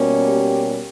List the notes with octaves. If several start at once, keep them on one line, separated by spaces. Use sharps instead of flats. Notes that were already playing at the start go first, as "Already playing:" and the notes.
Already playing: B2 G3 A#3 C#4
G4